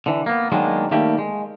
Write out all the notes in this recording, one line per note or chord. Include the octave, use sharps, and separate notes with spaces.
D3 E3
A#3 B3
D#3 F#3 G#3 A#3 B3 D4
D#3 G3 A3 A#3 G4
G#3